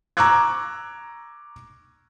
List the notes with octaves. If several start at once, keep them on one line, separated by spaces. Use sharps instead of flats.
A#5 C#6 D6 E6 F#6 G#6